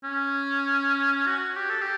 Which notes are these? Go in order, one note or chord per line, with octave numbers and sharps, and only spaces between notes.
C#4
F#4
G4
A4
G4